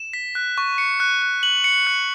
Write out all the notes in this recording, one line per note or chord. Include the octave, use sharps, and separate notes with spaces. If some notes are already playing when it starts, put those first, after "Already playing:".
Already playing: E7
B6
F#6
C#6
C#7
F#6
F#6
F#7
C#7
F#6